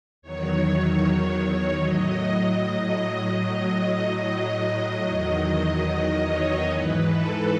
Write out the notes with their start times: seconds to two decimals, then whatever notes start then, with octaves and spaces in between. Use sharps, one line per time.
0.22 E2 D#3 F#3 C#5
1.83 A2 F#3 D#5
3.45 A2 F#3
4.25 D#5
5.06 E2 D#3 F#3
5.86 D#5
6.27 C#5
6.67 G#2 E3 B4
7.07 A4